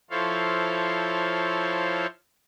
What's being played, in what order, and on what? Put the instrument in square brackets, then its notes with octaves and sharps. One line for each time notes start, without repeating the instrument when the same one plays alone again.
[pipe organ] F3 E4 A4 C5 C#5 F5